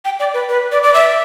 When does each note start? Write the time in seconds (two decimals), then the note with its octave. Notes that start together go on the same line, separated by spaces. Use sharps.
0.05 G5
0.19 D5
0.34 B4
0.49 B4
0.72 D5
0.83 D5
0.94 E5